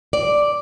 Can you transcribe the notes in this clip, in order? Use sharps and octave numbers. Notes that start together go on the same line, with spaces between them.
D5